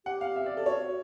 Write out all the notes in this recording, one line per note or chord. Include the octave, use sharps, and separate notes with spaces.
G4 F#5
F5
E5
D5
G4 A4
F#4 C#5